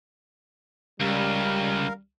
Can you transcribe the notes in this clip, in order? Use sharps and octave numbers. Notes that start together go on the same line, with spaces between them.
C#2 C#3 G3 A#4 F5